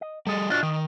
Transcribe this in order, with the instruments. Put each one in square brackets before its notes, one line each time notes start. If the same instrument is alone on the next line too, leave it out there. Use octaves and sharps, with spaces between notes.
[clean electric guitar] D#5
[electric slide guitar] G3 G#4 [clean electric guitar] A4 D#5
[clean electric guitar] D4 F4 [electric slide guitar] F#4 D5 D#5
[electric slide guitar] D#3 [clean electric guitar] D#5